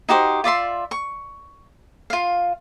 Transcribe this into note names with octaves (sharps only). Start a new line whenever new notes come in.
D#4 F#4 G4 C5
F4 D5 E5 C6
C#6
F4 F5